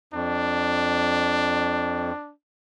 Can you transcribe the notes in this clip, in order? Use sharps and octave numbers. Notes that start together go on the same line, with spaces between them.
F2 D4